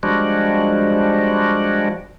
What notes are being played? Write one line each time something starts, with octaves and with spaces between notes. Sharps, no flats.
F3 G3 G#3 D4 F#4